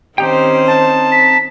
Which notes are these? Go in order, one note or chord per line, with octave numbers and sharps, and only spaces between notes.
D#3 C4 C#4 D#4 G4 C5 G5
A5
B6